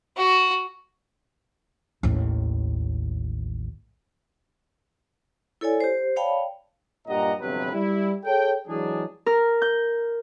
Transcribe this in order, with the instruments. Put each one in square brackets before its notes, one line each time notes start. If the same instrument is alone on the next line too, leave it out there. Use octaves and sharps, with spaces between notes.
[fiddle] F#4
[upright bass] A1 D#2
[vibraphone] E4 A4 C#5 D5 G#5
G4 C5
C#5 D5 F5 G5 A5 B5
[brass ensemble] G2 A#2 G4 D#5 F#5 A#5
G1 F2 C3 F#3 B4
G3 E4
G#4 A4 C#5 G5
E3 F#3 G#3 D4 G#4
[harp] A#4
G6